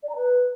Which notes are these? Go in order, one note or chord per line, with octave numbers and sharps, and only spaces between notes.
D5
A#5
B4